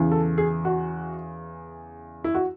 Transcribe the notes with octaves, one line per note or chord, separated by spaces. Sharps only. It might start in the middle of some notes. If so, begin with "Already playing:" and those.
Already playing: E2 C#3 E3
A4
G#4
F#4
E4
F#4